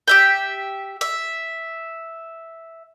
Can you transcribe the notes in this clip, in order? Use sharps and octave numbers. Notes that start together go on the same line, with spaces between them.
G4 E5 G5
E5